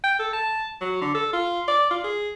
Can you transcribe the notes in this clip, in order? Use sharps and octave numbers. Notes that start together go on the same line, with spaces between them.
G5
A4
A5
F#3
D3
A4
F4
D5
F4
G#4